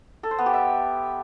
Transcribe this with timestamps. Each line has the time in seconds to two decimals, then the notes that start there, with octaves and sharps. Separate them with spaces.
0.23 A4
0.31 C5
0.38 B3
0.46 G4
0.54 E5